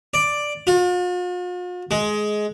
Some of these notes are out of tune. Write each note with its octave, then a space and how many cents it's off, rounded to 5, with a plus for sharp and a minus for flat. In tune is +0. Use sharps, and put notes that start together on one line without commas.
D5 +5
F4 +45
G#3 +15